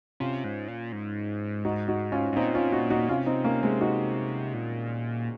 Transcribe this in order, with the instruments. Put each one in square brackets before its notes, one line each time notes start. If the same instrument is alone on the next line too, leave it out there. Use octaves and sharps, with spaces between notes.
[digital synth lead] C3 [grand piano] C#4 F4
[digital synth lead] G#2
A#2
G#2
[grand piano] D#4 F#4
D#4 F#4
C#4 F4
[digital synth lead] G#2
[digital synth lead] A#2 [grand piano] C4 D#4
[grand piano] C#4 F4
D#4 F#4
D#4 F#4
[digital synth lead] C3 [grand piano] C#4 F4
[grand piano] C4 D#4
A#3 C#4
G#3 C4
D#4 F#4
[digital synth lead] A#2